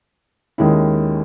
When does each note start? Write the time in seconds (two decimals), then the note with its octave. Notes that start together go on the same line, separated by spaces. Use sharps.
0.58 D#2 D#3 G#3 C#4 E4